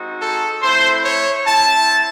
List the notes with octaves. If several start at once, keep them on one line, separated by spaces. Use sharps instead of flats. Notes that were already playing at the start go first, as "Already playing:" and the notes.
Already playing: G#3 C4 D#4 F#4
A4
A3 C4 E4 C5
C#5
C4 E4 A5